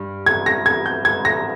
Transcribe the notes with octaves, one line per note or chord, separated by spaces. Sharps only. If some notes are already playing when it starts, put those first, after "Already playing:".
Already playing: G2
G#6
A#6
G#6
G6
G#6
A#6